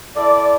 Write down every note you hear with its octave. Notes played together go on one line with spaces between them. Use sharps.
E4 A4 D5